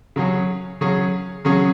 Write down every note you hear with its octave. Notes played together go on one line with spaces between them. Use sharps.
C#3 F#3 C#4 G#4
C#3 F#3 C#4 G#4
C#3 F#3 C#4 G#4